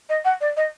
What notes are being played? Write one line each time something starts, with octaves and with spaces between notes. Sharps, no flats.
D#5
F#5
D5
D#5